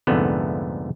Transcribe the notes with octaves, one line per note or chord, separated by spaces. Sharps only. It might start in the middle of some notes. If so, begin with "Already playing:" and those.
C2 F2 G#2 D3 A3 B3